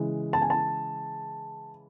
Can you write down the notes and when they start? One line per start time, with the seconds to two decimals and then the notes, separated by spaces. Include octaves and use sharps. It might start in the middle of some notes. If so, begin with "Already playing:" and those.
Already playing: C#3 E3 G#3
0.33 A5
0.42 G#5
0.50 A5